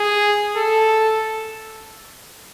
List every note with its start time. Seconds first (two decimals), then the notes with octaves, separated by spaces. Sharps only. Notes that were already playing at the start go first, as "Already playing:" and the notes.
Already playing: G#4
0.57 A4